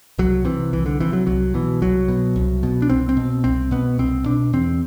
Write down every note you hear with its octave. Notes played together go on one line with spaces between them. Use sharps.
C2 F#3
C3 E3
C2 E3
D3
C3 E3
F#3
C2 F#3
B2 E3
C2 F#3
B2
C2
B2
D4
C2 C4
C4
B2
C2 C4
B2 B3
C2 C4
B2 D4
E2 C4